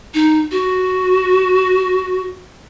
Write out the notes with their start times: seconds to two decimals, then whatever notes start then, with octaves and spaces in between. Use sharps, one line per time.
0.14 D#4
0.51 F#4